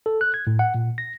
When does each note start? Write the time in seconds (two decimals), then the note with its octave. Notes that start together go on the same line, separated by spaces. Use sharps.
0.06 A4
0.21 F#6
0.34 G#6
0.47 A2
0.59 F#5
0.75 A#2
0.98 A#6